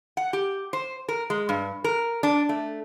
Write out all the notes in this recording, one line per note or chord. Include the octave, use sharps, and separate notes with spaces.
F#5
G4
C5
A#4
G#3
G2
A#4
D4
A3